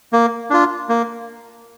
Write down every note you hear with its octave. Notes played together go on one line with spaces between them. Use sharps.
A#3
D4 F4
A#3